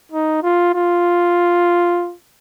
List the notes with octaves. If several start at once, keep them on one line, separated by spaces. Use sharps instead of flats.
D#4
F4
F4